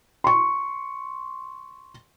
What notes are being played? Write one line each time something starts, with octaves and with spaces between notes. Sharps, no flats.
C6 C#6